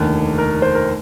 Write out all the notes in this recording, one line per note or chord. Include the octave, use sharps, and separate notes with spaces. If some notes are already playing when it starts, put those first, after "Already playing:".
Already playing: F1 D#2 D3
A#4
C5
A#4